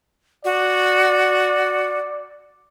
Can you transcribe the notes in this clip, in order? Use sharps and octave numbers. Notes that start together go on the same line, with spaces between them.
F#4 D5